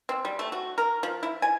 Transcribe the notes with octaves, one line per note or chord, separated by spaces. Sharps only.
C4
G3
A3
F#4
A#4
F3
E4
G#5